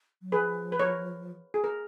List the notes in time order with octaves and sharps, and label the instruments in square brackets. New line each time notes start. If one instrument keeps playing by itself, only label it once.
[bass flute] F#3
[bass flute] F3 [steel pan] G#4 B4
[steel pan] B4
A#4 C#5
G#4
A#4